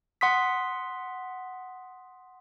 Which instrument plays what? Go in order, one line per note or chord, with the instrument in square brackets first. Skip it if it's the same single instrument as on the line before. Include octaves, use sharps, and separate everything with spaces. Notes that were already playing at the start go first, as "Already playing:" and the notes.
[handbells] F#5 C6 D#6 B6